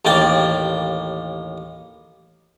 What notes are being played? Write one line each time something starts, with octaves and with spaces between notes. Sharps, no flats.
A1 D#2 A#3 D5 G5